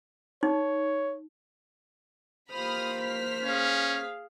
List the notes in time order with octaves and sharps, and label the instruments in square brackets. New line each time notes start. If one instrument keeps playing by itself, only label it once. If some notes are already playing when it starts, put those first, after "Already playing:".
[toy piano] D#4 [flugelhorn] C#5
[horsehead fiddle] A#3 C5 [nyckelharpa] F4 G4 [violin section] B5 D#6 F6
[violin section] F6 B6
[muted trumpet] C#4 [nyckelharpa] G#4 F5